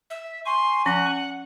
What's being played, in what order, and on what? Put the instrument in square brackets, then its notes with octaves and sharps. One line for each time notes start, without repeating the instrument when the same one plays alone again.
[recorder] E5
[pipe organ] G#5 C#6 [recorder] C6
[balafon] F3 C#4 [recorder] F#5